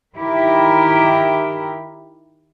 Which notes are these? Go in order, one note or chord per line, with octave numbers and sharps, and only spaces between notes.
D#3 E4 G4 A#4